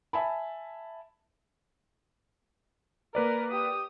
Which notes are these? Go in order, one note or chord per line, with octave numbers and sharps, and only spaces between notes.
E5 G#5 A5 B5
A#3 A#4 B4 D5
G4 D#6